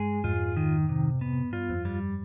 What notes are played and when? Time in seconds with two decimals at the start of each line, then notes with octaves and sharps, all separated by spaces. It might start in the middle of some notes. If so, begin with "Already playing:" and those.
Already playing: G2 G#3 G#4
0.24 F2 G#2 F4
0.57 D#3
0.89 C3
1.21 B3
1.53 G2 F4
1.70 F2
1.85 G2 G3